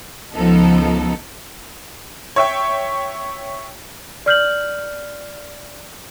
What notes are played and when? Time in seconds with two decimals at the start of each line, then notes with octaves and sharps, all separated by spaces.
0.33 C#2 F3 B3 D#4 A4
2.36 C#5 E5 G5
4.26 D5 F6 G6 F#7